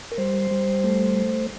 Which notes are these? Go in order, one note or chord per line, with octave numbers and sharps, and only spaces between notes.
A#4
G3 C5
G3
A3